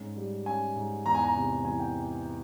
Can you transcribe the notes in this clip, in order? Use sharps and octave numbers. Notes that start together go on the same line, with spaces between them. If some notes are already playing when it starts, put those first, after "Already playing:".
Already playing: G#2 C#4
G3
C#4 G#5
G#2
E2 A#5
G#5
A#5
C3
E3 G#5
G5